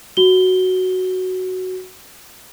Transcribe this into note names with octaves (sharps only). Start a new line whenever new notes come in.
F#4 G7